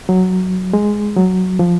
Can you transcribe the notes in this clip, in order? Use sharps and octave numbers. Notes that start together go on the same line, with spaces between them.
F#3
G#3
F#3
F3